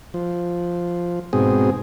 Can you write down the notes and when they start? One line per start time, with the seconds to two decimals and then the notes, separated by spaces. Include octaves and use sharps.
0.14 F3
1.33 G#2 B2 C4 G#4